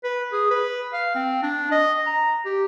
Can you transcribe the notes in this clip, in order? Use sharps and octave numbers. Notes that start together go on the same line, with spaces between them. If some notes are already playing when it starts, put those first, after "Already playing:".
B4
G#4
B4
F5
C4
D4
D#5
A#5
G4